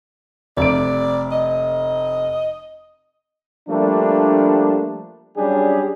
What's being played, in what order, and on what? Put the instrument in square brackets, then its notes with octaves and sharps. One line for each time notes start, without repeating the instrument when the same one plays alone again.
[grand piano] F1 C3 D7 [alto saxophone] D5
[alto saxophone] D#5
[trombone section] F3 G3 A3 A#3 D4
F#3 G3 C#4 D4 G4 G#4